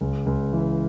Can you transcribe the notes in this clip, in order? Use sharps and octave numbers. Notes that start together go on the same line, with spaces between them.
C#2
C#2
E3